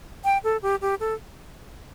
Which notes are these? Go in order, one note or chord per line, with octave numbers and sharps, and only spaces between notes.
G5
A4
G4
G4
A4